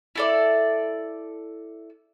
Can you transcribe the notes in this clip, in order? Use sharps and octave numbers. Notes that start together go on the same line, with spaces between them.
E4 A4 D5